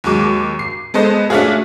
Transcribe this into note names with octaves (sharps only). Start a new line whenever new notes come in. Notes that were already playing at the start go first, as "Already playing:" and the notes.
D#2 F#3 G#3 D6
C7
G#3 B3 A4 C5 D#5
A3 C#4 D4 F4 F#4 G#4